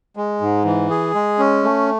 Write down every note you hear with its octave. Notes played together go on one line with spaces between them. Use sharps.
G#3
G#2
E3
G#4
G#3
C#4
A3